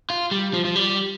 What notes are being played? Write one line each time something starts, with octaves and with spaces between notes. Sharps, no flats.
F4
G3
F3
F3
G3